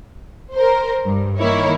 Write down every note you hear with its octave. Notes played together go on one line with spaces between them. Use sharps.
A#4 C5
G2
D#3 A#3 E4 C#5